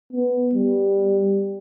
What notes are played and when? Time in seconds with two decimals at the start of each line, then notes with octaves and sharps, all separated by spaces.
0.13 B3
0.55 G3